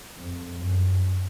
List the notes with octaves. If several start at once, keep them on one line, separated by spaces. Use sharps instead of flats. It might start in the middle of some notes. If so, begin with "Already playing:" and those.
F2
F#2